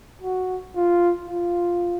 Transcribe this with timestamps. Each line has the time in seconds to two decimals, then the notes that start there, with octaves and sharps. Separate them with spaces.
0.22 F#4
0.75 F4
1.28 F4